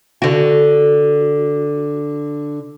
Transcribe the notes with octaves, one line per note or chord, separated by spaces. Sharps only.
D3 F#4